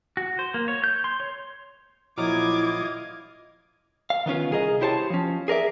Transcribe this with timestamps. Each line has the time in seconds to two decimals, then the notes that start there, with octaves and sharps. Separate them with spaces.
0.17 F#4
0.39 C5
0.54 A#3
0.68 C#5
0.84 G6
1.04 C6
1.20 C#5
2.18 A#1 F#3 E4 F4 D#5 A#5 D6 G#6
4.10 F5
4.26 D#3 B3 C#4 F4
4.51 C2 G#4 A#4 D#5
4.81 E4 G4 C5 C#5 A5
5.10 F3 C#4
5.48 G#4 A#4 D5 E5